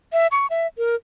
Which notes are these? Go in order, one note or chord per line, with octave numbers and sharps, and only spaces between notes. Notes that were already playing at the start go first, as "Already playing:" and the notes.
E5
C#6
E5
A#4